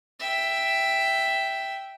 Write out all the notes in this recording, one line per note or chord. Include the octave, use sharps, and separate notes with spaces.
E5 G5